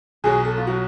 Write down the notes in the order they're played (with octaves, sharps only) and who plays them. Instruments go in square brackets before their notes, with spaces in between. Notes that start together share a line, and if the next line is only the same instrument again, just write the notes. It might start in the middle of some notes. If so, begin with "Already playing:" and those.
[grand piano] B1 B2 F#3 [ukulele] G#4
[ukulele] A4
F4
[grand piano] B2 F#3 [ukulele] F#4